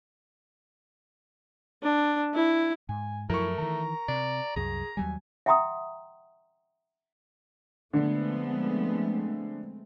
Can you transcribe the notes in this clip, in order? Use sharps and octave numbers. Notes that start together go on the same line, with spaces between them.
D4
E4
G#2 G#5
F#2 F3 F#3 A3 E4 A#4 C#6
D#3 E3 A#5
C3 D5
C2 F#2 G#4 A#5
D#2 F#3 G3 G#5
E5 F#5 G5 A#5 C6 D#6
D3 F3 G#3 A3 B3 C4